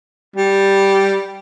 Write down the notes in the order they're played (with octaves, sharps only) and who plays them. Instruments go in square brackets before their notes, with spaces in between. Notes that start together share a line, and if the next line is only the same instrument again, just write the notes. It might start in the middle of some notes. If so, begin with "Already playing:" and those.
[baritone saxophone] G3